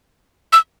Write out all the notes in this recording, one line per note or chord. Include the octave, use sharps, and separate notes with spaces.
E6